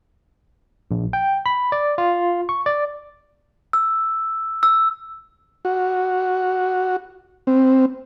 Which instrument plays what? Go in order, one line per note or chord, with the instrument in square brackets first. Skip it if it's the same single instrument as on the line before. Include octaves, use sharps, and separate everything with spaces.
[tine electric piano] A#1
G5
B5
D5
F4
C#6
D5
[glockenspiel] E6
E6
[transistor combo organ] F#4
C4